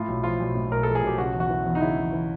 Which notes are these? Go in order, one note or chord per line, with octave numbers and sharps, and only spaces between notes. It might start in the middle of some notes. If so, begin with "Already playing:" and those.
Already playing: A2 F4
B1
F3 F4
B1
A2
B1 A#4
F3 A4
G#4
B1 G4
C#3 F#4
E2
F#4
E3
E2
D#4
C#3 E4
E2
E3